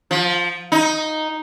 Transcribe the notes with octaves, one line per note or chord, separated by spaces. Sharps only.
F3
D#4